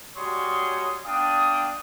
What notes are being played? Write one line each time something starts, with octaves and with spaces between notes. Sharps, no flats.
G3 G#3 F#4 C#5 C6 D#6
B3 D4 F5 G5 D#6